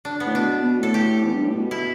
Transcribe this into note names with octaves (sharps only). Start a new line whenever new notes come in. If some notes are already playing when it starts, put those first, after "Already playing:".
D4
B3
A2
B2 D4
B2
A2 A4
G4
E2
G2
A2
B2
E4